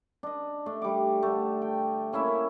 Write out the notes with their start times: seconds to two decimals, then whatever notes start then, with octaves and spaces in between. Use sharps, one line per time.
0.23 D4 D#5
0.66 A3 D4
0.82 G3 D6
1.23 D3 A3
1.62 G5
2.13 A#3 C#4 E4 E5